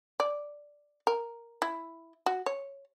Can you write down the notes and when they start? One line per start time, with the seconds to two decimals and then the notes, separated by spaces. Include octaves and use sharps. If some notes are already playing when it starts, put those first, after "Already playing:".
0.20 D5
1.07 A#4
1.62 E4
2.26 F#4
2.46 C#5